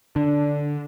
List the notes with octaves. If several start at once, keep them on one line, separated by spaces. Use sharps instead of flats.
D3 D4